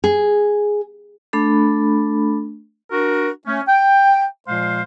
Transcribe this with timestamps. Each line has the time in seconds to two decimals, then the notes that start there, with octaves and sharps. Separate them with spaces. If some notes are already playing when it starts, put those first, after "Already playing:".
0.04 G#4
1.33 A3 D4 A4 B5
2.92 D4 F#4 A#4
3.47 A3 C#4
3.68 G5
4.47 A#2 F3 G#3 C5 F5 C6